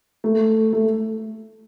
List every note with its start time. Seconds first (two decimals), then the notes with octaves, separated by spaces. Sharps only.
0.24 A3
0.73 A3